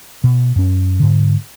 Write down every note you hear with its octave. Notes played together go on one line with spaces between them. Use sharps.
B2
F#2 C#4
G#2 D3